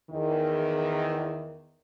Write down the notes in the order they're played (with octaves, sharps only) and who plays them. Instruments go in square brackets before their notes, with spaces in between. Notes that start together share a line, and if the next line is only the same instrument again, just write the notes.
[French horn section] E2 D#3